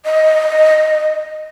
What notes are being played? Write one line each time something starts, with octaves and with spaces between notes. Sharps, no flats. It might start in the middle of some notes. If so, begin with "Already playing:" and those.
D#5